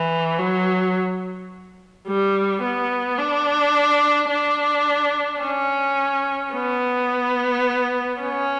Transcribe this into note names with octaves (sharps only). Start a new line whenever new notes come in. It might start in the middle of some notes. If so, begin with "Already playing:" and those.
Already playing: E3
F#3
G3
B3
D4
D4
C#4
B3
C#4